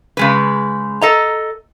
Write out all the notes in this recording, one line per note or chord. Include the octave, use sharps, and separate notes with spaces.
C#3 G#3 B4
A4 D#5 A#5